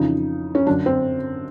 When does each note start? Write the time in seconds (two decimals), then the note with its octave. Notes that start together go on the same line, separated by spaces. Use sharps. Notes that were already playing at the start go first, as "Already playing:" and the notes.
Already playing: F2 C#3 E3 D#4
0.55 C#4
0.67 F#2 D4
0.69 D3
0.86 C4